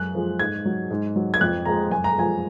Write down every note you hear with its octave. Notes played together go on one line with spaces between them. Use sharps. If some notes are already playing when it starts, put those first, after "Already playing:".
Already playing: F#2 F#6
F3 G#3
G#2 G#6
F#3
G#2
F#3
G#6
F2 F#6
F3 G#3 A#5
F#2 G#5
A#5
F3 G#3 G#5